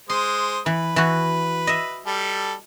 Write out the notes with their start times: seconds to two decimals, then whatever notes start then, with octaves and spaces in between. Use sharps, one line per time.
0.09 G#3 C5 C6 D#6
0.66 E3 B4
0.96 E3 F#4
1.67 D#5 E5
2.06 G3 A4